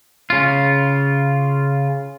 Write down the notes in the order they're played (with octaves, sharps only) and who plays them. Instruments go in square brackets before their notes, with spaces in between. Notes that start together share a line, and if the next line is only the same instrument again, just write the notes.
[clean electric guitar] C#3 F4